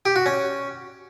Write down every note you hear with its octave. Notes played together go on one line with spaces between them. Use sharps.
G4
F#4
C#4